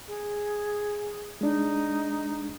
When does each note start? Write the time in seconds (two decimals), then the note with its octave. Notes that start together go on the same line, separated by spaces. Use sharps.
0.08 G#4
1.41 G#3 D4 D#4